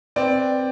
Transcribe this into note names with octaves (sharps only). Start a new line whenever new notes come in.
C4 B4 D5